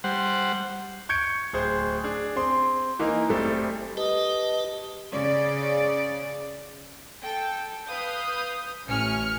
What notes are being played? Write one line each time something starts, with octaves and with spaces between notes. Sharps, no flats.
G3 C5 F#5
C#6 G6 G#6 C#7 D7
D1 G#4 C5
D4 G#4
C4 C6
E3 A#3 D#4
F#1 G3 A3 C4
G4 B4 D#5 A5
C#3 D5
A4 G5
B4 F5 D#6 G6
A1 C#4 G#5 F6 C#7